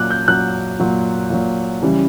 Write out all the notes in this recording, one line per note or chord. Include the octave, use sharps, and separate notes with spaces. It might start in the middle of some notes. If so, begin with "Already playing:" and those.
Already playing: A#2 F#3 D6 F#6
G6
A#2 F#3 F#6
A#2 F#3
A#2 F#3
C#3 E3 G3